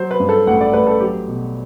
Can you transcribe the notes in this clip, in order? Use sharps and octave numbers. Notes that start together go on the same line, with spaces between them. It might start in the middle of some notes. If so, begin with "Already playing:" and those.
Already playing: F#3 C5
B4
G2
A4
A1 F#5
D5
A1 B4
A4
F#3 G4
B2